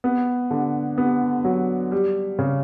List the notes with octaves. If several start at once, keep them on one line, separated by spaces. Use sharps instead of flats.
B3
D3
B3
F#3
G3
C#3